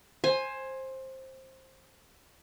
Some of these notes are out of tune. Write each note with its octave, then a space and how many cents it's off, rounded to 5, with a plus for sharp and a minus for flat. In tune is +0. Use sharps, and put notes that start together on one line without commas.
C5 +15 G#5 +0